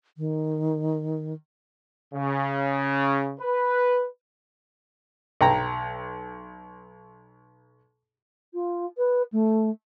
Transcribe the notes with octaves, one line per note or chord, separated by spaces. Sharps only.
D#3
C#3
B4
B1 G5 A#5
F4
B4
A3